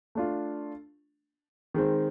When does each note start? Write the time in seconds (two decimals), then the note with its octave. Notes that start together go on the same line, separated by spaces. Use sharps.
0.15 A3 D4 F4
1.74 D#3 G#3 C4